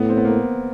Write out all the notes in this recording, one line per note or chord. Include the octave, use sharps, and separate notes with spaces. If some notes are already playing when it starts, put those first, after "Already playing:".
Already playing: A2 B3
C4
B3
A#3